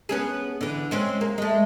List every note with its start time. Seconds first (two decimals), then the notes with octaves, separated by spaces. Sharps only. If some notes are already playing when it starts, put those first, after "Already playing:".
0.09 B3 C#4 G#4
0.61 D3 E3
0.91 G#3 C4 C#4
1.21 A#3
1.38 G#3 A3